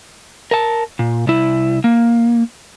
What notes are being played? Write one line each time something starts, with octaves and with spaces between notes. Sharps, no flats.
A#4 A5
A#2
C2 E4
A#3